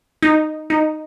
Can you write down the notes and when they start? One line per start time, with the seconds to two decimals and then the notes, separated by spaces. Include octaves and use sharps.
0.22 D#4
0.70 D#4